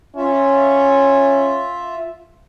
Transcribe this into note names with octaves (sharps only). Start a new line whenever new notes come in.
C#4 F4 E5